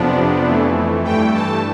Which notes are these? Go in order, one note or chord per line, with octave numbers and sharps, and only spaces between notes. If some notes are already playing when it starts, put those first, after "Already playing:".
Already playing: F2 C3 F3 B3 D4
F2 E3 A3
G2 E3 A3 G5
A5